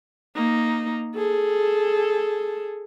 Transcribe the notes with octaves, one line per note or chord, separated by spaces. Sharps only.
A#3 D#4
G#4 A4